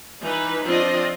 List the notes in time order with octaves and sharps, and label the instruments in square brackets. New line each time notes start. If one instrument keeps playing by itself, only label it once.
[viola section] E3 D#4 B4
F3 C4 D4 F4 D#5